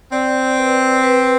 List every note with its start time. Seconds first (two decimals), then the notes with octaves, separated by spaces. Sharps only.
0.12 C4 D5
0.58 B4
1.04 B4